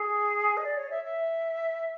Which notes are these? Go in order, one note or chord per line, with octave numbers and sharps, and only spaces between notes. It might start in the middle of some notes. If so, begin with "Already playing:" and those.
Already playing: G#4
D#5
D5
C#5
E5
E5